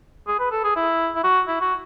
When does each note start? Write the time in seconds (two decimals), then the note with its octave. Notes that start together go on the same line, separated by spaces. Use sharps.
0.27 G#4
0.39 B4
0.52 A4
0.64 G#4
0.76 E4
1.16 E4
1.24 F#4
1.48 E4
1.61 F#4